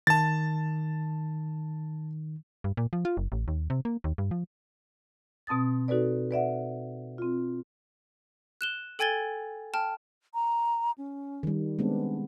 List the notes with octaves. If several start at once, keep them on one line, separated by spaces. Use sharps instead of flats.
D#3 A5 A6
G2
A#2
F3
F4
F#1
A1
D#2
C3
A#3
D#2
G2
F3
B2 C4 A5 D#6 A6
D#4 F#4 A4 B4 D5
B4 D5 E5 F#5
C4 F4
F#6 E7 G7
A4 G5 G#5 G#6 A6 G7
G5 A5 F6
A#5
C#4
D#3 G3
G#3 B3 C4 D4